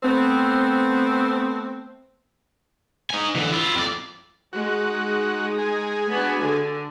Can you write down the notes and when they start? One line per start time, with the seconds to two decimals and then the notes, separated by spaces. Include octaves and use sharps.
0.03 A3 B3 C4
3.10 D#4 G#5
3.35 D3 E3
3.52 E4 F4
3.75 F2 D5
4.53 G#3 D#4 F#4
5.59 G#4
6.09 B3 D4 F#4
6.39 D3